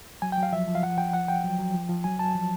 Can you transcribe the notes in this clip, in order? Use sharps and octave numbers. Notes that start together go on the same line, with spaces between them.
F#3 G#5
G5
F#3
F5
F3 E5
F3
F5
F3 F#5
F3 G5
F3 F#5
F3 G5
F#3
F#3
F3
F3
F#3 G#5
F#3 A5
F3